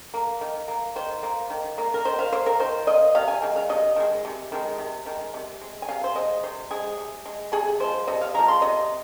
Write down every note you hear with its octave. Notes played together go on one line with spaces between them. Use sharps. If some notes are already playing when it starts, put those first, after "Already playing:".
A#3
D#3
A#3
D#3 C5
A#3
D#3
A#3
A#4
D#3 C5
F5
A#3 C5
A#4
D#3 C5
A#3 D#5
C3 F5
G#5
D#3 G#3
F5
C3 D#5
D#3 G#3
C3
D#3 G#3
C3
D#3 G#3
C3
G#3
G#5
C3 F5
C5
G#3 D#5
C3 C5
G#3 G#4
C3
G#3
C3 G#4
F3 G#3 C5
C3 D#5
F5
F3 G#3 A#5
C6
C3 D#5